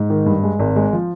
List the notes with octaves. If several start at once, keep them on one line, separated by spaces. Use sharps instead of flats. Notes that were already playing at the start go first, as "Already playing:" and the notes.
Already playing: G#2
D#3
G2
G#3
G#1
G#3
F3